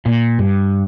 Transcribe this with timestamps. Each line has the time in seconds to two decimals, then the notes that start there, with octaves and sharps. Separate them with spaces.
0.06 A#2
0.39 G2